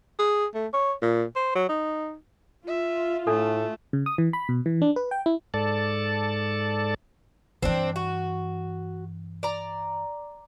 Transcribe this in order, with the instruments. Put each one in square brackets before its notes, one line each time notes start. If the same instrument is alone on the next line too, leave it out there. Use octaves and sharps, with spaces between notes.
[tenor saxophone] G#4
A3
C#5
A#2
C5
F#3
D#4
[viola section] F4 [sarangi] E5
[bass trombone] A2 [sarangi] A3 [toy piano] D4 A4
[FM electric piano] C#3
D#6
E3
B5
B2
E3
D4
B4
G5
E4
[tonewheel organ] G#2 A4 D5 A5
[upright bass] G2 E3 [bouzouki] C4 D4
[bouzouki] F#4
D5 A#5